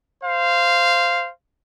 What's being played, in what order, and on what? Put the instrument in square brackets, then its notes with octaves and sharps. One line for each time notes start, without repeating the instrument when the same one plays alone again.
[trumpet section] C5 F5